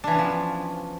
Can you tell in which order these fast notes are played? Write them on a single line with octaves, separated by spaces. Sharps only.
D4 E3 C#4 B3 F3